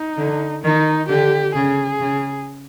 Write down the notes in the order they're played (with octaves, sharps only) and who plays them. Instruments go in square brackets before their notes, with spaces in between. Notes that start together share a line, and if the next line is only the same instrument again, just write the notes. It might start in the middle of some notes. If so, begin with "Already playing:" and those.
Already playing: [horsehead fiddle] D#4
[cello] D3
[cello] D#3 [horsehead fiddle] D#4
[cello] D3 [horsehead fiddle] G4
[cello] C#3 [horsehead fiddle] G#4
[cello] C#3